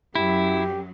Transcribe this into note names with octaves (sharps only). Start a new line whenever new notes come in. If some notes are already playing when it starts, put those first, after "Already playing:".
F#2 F#3 E4 G4